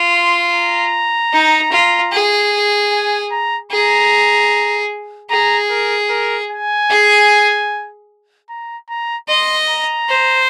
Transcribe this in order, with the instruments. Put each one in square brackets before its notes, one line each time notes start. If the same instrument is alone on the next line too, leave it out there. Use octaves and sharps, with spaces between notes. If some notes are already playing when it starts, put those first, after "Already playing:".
Already playing: [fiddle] F4
[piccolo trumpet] C6
A#5
[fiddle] D#4
F4
G#4
[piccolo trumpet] G#5
A#5
[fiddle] G#4 [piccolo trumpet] A#5
[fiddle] G#4 [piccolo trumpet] A#5
[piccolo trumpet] A#4
A#4
G#5
[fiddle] G#4
[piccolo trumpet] A#5
A#5
[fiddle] D#5 [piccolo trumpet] C6
[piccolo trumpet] A#5
[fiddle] C5